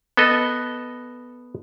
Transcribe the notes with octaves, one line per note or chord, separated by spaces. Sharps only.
B3 A4 D#5